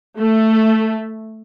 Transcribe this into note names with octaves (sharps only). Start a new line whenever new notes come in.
A3